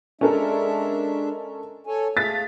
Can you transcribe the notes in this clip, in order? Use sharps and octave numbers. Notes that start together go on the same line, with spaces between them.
G#3 C#4 D4 A4 A#4 E5
A4 C#5 G#5
A3 G#4 F5 A6 B6